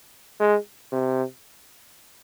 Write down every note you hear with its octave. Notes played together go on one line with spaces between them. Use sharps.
G#3
C3